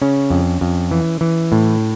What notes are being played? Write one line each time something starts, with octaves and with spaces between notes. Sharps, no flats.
C#3 C#4
F2
F2
E3
E3
A2